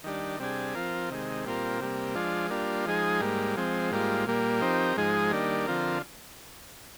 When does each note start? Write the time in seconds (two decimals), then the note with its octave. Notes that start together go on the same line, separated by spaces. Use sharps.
0.04 D#3 G3 D4
0.39 C3 G3 D4 G#4
0.74 F3 C4 F4 A#4
1.10 C3 D#3 G#3
1.45 A#2 G3 C4 F4 A#4
1.80 C3 G3 A#3
2.15 F3 G#3 D4 F4
2.50 G3 A#3 D4 F4
2.86 F3 G#3 D#4 G#4
3.20 G#2 G3 A#3
3.56 F3 G#3 C4
3.91 G#2 G3 A#3 F4
4.27 A#2 G3 A#3
4.61 F3 C4 D#4 G4 A#4
4.97 G#2 F3 G#3 D#4 G#4
5.32 D#3 G3 A#3 D4
5.67 D3 F3 C4 F4 A#4